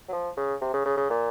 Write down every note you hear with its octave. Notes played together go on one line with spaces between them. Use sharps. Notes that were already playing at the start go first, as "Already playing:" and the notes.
F#3
F3
C#3
C3
C#3
C#3
C#3
A#2